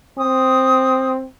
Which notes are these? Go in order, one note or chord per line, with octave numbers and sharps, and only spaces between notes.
C4 D#6